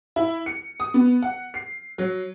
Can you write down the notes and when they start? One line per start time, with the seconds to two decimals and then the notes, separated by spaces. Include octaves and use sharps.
0.16 E4
0.46 C#7
0.80 D#6
0.94 B3
1.22 F#5
1.54 C7
1.98 F#3